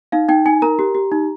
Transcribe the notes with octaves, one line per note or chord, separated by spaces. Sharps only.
D#4 F5
D#4 G5
D#4 G#5
A#4 A#5
G4
G4
D#4